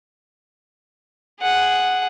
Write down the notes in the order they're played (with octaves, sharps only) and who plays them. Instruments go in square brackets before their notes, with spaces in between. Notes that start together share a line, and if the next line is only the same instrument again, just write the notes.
[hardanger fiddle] G#4 F#5